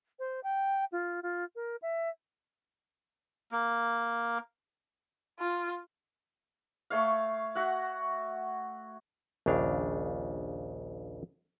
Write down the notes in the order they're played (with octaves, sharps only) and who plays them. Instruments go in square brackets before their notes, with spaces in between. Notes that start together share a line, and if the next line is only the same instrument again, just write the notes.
[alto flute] C5
G5
F4
F4
A#4
E5
[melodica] A#3
[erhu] F4
[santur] A3 C#5 F5
F#4 E5 F#5
[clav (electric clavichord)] A#1 D#2 C#3 D4 F5